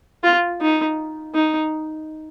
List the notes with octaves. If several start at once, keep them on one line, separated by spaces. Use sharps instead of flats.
F4
D#4
D#4